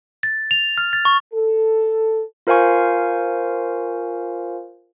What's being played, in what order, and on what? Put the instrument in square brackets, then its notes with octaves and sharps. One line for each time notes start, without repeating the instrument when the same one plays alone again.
[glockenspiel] A6
F7
F6
A6
C#6
[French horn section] A4
[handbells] F4 A#4 C5 F5 G#5 C#6